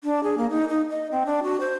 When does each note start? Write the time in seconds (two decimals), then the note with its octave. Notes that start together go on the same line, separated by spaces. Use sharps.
0.04 D4
0.23 G#4
0.38 A#3
0.50 D#4
0.69 D#4
0.90 D#5
1.12 C4
1.26 D4
1.43 F#4
1.60 C5